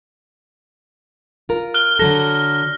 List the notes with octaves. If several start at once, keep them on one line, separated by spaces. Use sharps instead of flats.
F4 A#4
F6 F#6 G7
D3 F#3 A4 A#6